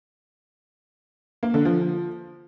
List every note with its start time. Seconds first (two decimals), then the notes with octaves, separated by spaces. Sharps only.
1.43 A#3
1.54 D3
1.65 F3